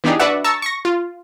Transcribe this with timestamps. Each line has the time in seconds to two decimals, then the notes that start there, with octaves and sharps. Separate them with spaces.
0.04 E3 B3 D4 D#4 G4 G#4
0.20 D4 F#4 B4 D5 E5 F#5
0.44 A5 A#5 C#6 E6
0.62 C#6 A#6
0.85 F4